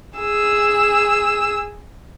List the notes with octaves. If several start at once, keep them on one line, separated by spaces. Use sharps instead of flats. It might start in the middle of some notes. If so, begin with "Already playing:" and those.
G#4 E6